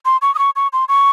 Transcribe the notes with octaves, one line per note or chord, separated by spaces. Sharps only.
C6
C#6
D#6
C#6
C#6
C6
C#6